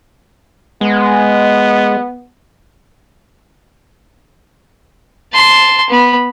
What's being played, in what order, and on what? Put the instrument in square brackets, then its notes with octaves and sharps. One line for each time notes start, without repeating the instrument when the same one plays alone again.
[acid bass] G#3 [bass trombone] B3
[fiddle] A5 C6
B3 B5